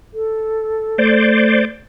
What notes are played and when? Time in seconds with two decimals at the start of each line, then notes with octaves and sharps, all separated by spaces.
0.14 A4
0.98 A3 C5 D5